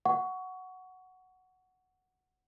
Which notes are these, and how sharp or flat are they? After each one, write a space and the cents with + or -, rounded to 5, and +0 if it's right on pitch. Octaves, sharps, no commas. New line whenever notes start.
F#5 +0 C#6 +20